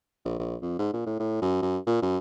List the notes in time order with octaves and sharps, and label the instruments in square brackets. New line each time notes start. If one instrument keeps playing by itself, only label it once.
[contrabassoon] A#1
A#1
F2
G#2
A#2
A2
A2
F#2
F#2
A#2
F#2